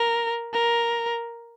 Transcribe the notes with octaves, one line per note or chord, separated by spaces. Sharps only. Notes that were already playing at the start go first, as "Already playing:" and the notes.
Already playing: A#4
A#4